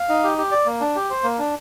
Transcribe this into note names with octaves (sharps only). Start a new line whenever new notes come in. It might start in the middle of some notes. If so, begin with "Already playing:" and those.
Already playing: F5
D#4
G4
G4
D5
A#3
D4
G4
C5
A#3
D4